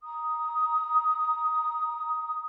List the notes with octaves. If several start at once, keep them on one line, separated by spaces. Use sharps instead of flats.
A#5 D#6